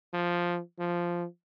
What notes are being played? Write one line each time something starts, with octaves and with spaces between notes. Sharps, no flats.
F3
F3